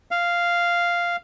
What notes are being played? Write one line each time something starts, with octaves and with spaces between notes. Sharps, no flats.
F5